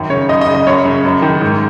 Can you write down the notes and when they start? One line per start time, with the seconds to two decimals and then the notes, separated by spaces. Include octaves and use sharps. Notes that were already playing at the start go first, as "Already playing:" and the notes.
Already playing: F#2 D#3
0.10 C#3 C#5
0.28 F#2 D#5
0.41 D#5
0.47 C#3
0.55 D#5
0.67 F#2 C#5
0.85 C#3
1.05 F#2
1.22 D#3
1.41 G#2